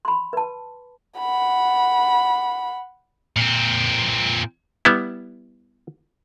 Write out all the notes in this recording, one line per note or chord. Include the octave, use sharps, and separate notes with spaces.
B5 C6
B4 A5
F#5 B5
A#2 C4
G3 B3 E4